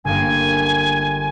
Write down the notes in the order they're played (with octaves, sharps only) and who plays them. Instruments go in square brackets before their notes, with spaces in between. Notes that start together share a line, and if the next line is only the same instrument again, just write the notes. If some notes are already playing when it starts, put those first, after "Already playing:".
[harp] G1 A#3 [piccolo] G#5